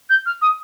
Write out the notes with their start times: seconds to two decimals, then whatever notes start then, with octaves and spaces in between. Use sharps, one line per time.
0.09 G6
0.25 F6
0.41 D#6